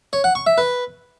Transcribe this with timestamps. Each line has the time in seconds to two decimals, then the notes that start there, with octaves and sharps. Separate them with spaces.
0.13 C#5
0.24 F#5
0.35 C#6
0.47 E5
0.58 B4